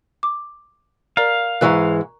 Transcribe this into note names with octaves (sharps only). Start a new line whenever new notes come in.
D6
A#4 D5 F5 A#5
G#2 E3 G#3 A#5 C#6 F#6